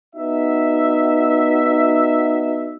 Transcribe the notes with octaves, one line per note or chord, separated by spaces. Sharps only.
B3 D#4 F#4 E5